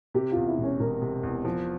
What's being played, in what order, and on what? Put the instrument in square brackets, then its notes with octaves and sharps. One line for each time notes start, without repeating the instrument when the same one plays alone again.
[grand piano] C3 [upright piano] G4
[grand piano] E2 [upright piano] F4
[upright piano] E4
[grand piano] E1
[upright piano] C#4
[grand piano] E1 [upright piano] A#4
[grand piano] C3
E2
F3